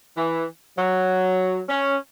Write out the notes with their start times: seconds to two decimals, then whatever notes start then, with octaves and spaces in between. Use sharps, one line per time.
0.16 E3
0.77 F#3
1.68 C#4